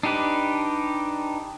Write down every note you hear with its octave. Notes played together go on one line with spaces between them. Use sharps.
D4 D#4 G4 B4